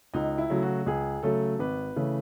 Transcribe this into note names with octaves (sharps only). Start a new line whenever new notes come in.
C#2 D#4
E4
C#3 F#3 A3
F#4
C#2 G#4
C#3 F#3 A3 A4
G#1 B4
C#3 E3 A3